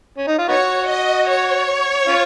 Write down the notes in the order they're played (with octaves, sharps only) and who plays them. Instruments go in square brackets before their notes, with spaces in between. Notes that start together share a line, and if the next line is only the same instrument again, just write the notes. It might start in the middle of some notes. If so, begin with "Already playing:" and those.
[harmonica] C#4
D#4
F4
[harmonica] B3 D#4 F#4 [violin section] C#5
[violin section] D#5
C#5
[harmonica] C#4 F4